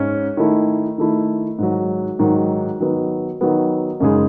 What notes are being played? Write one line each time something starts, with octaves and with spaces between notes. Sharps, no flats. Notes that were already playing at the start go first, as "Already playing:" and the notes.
Already playing: G#2 C#4
D#3 A3 E4
D#3 A3 E4
G#2 D#3 F#3
G#2 D#3 F#3
D#3 F#3 B3
D#3 F#3 B3
F#2 C#3 G#3 D#4 G#4